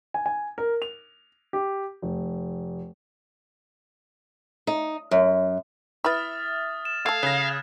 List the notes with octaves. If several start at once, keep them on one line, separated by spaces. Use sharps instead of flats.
G#5
G#5
A#4
F7
G4
F1
D#4
F#2
E4 B4 E5 D#6 F6 A6
E7
A3 A4 F5 G#6
C#3 F#6 A#6